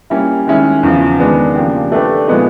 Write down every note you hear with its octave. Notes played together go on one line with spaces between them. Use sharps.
G3 A#3 C#4 E4
D#3 G#3 C#4 E4
E2 C#3 F3
D#3 G#3 B3 D4
C#3 F3 A#3 D4 G4
A3 D4 G4 B4
A#2 F3 G#3 B3 D#4